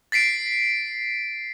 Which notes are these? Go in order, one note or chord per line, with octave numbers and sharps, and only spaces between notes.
A6 B6 C7 D7